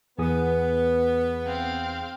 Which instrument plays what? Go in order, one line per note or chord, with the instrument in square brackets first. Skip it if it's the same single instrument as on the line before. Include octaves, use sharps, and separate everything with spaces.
[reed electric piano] E2 G#4 D#6 [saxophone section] B3
[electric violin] C4 F5